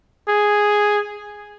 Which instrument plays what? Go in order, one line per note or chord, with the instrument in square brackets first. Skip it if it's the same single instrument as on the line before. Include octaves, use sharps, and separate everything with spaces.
[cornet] G#4